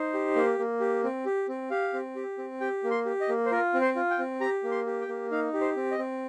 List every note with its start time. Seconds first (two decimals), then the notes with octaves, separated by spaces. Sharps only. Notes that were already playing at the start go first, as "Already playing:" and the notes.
Already playing: D#4 C5
0.14 G4
0.36 A#3
0.59 A#3
0.80 G4
1.04 C4
1.26 G4
1.49 C4
1.70 G4 F5
1.94 C4
2.16 G4
2.38 C4
2.60 G4 G5
2.84 A#3
2.91 C6
3.06 G4
3.21 D#5
3.29 A#3
3.46 C5
3.51 F4 A#4
3.74 C4
3.81 C5
3.96 F4
4.11 G5
4.19 C4
4.41 G4 A#5
4.63 A#3
4.71 C6
4.87 G4
5.01 G5
5.08 A#3
5.31 D#4 F5
5.54 G4
5.61 C5
5.76 C4
5.91 D#5
5.98 C4